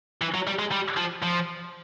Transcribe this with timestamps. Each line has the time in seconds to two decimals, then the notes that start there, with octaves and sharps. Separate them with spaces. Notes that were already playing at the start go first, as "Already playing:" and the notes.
0.22 E3
0.34 F#3
0.47 G3
0.59 G#3
0.72 G3
0.97 F3
1.22 F3